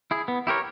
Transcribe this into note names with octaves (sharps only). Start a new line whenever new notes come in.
E4 G#4
B3
E4 G4 A#4 C#5